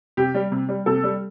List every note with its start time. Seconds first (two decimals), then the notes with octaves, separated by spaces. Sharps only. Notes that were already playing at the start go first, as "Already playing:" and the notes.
0.17 C3 G4
0.35 G3
0.52 C3
0.69 G3
0.86 C3 A4
1.03 G3